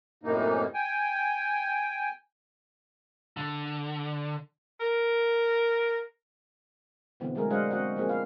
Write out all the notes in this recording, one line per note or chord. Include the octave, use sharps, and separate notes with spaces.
F#2 A2 C3 E3 A#3 D#4
G5 G#5
D3
A#4
B2 D3 E3 B3 C4
F#3 G#3 A3 G#4 A#4
G#3 D4 C5 D#5 F5 F#5
C4 F#4 D#5 F#5
F3 A#3 C4 G#4
B4 F5